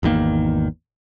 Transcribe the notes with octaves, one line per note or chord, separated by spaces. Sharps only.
G#1 E2 D#3 A#3